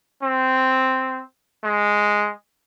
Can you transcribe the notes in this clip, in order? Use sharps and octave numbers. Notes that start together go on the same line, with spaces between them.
C4
G#3